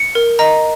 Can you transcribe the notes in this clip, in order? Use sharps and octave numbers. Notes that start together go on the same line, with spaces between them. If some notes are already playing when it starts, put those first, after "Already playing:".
Already playing: C#7
A#4
D#5 A#5